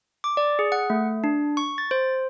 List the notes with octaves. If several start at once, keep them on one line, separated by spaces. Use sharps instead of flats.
D6
D5
G#4
F#5
A3
D4
C#6
A6
C5